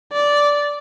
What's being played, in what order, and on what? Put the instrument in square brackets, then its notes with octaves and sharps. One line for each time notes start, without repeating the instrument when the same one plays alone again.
[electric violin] D5